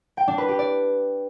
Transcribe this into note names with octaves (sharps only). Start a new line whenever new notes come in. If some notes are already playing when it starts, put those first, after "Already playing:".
G5
D4
B4
G4
D5